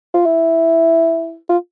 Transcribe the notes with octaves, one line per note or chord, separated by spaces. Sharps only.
F4
E4
F4